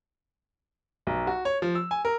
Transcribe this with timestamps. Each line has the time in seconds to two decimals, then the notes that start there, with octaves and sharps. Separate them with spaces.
1.07 B1
1.27 F#4
1.45 C#5
1.62 F3
1.75 E6
1.91 G#5
2.05 A#4